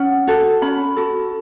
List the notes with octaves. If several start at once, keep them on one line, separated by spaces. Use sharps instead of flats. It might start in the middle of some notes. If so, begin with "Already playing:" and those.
Already playing: C#4 F#5
F#4 A4
C#4 B5
F#4 A4